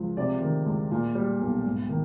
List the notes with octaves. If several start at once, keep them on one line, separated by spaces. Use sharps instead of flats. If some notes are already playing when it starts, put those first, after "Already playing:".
Already playing: C#2 F3
C3 D5
D#3
C#2
A#2
G3
B1
G#2
D#3